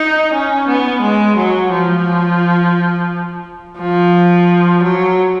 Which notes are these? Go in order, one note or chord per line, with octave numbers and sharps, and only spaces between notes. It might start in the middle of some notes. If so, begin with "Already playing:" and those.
Already playing: D#4
C#4
B3
G#3
F#3
F3
F3
F#3